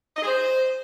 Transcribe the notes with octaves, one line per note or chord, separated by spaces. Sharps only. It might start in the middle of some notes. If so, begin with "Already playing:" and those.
D#5
G#4
C5